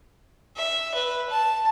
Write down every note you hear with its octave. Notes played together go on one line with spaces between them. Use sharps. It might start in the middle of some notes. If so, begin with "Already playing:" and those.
E5
B4
A5